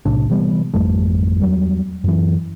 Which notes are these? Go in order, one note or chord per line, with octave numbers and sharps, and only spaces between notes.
B1 A2 C3 D4
C3 E3 G3 B3
G#1 F2 G3 A3
E2 F#3 G3
F#2 E3